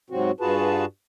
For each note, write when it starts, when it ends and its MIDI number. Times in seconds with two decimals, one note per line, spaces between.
0.10 0.31 44
0.10 0.31 48
0.10 0.31 54
0.10 0.31 60
0.10 0.31 66
0.40 0.85 43
0.40 0.85 65
0.40 0.85 66
0.40 0.85 68
0.40 0.85 71
0.40 0.85 81